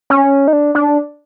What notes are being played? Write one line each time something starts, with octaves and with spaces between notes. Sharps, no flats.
C#4
D#4
D4
D4